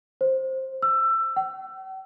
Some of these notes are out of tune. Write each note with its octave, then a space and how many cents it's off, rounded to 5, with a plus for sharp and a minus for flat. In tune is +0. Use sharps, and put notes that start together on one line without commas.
C5 +10
E6 +20
G5 -45